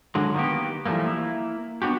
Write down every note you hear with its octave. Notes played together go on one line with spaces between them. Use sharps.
D3 F#3 G#3
D#3 G3 A#3 B3 G4
E3 F3 G3 A3 A#3
A#3 E4
B3 D4 F#4 G4